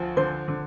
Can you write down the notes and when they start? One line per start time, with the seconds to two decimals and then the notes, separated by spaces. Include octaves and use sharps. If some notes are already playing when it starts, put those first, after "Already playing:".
Already playing: D2 F3
0.17 D3 C5
0.48 D3